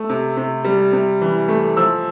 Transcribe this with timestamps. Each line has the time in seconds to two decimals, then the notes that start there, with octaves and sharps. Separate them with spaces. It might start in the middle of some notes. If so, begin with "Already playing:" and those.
Already playing: A3 E6
0.09 C3
0.37 C3
0.65 G3
0.93 C3
1.21 E3
1.48 A3
1.77 F3 E6